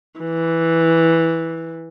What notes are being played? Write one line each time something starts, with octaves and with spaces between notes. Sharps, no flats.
E3